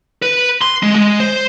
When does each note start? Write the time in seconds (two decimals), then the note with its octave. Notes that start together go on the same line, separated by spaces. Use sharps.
0.22 B4
0.62 C6
0.83 G#3
0.96 G#3
1.20 C5